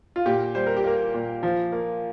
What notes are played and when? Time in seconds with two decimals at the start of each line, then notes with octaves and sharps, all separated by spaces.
0.16 F4
0.26 A#2 G4
0.55 G3 C5
0.67 A#4
0.77 G4
0.84 A#3 A#4
1.14 A#2
1.43 F3
1.72 A#3